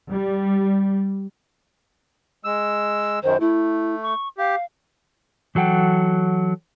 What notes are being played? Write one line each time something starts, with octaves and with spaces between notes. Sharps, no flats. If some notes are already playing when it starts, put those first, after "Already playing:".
G3
G#3 E6
F#2 D#3 C5
A3 E4
C#6
G4 F5
E3 F#3 A4 F#5 G5